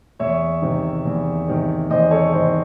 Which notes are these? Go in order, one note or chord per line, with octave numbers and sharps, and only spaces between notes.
E2 C#5 E5
C3 D#3
E2
C3 D#3
E2 C5 D#5
A4 C#5
C3 D#3 C5 D#5